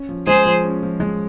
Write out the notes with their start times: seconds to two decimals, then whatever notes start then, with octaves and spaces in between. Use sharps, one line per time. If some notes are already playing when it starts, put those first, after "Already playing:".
Already playing: C#4
0.09 F3
0.27 G#3 G#4 C5
0.45 F3
0.64 C#4
0.83 F3
1.00 G#3